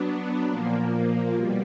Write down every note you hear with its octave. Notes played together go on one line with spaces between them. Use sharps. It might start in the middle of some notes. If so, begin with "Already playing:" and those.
Already playing: F#3 B3 D4
A#2 F3 A#3
B2 G3